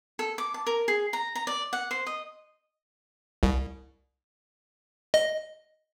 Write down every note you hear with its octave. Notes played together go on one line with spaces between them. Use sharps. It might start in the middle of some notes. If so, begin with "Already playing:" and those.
A4
D6
A5
A#4
G#4
A#5
A#5
D5
F#5
C5
D#5
C2
D#5